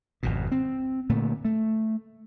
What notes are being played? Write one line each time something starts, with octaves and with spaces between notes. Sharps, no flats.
G#1 F2 B2
C4
A#2 D3 A3
A3